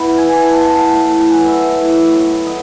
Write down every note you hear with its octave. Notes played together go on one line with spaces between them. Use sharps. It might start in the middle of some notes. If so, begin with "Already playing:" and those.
Already playing: B3 E4 B5
E3 G#5
A5
B3 E4
A5
A2 A5
G#5
F#3 B3
E5
A2
F#3 B3
A2 D#5